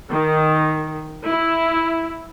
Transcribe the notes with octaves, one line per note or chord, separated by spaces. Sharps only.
D#3
E4